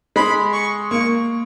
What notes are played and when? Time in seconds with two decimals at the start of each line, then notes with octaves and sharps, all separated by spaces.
0.16 G#3 B5
0.53 C#6
0.91 A#3 C#6